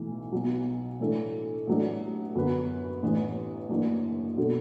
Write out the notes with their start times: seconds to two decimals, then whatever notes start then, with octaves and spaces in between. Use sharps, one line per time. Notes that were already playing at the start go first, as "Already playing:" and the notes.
Already playing: B1 A2 E3 A3
0.32 B1 B2 F#3
1.00 A2 E3 A3 D4 A4
1.67 A1 A2 F#3 A3 D4
2.35 F#2 D3 B3 F#4 B4
3.03 A1 A2 E3 D4
3.69 F#1 F#2 E3 D4
4.37 B2 F#3 D4 F#4 A4